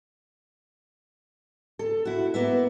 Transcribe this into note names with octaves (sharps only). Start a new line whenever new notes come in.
A4
E4 F#4
A#3 B3 E5